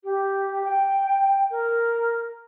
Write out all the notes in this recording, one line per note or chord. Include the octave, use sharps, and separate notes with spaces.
G4
G5
A#4